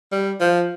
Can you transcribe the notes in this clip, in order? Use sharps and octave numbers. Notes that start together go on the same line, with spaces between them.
G3
F3